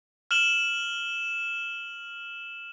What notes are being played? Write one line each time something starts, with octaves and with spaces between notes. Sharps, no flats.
F6 E7 F#7 G7